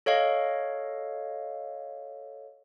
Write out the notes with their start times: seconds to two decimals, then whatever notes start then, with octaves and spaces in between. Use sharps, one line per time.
0.06 A4 C#5 D#5 F5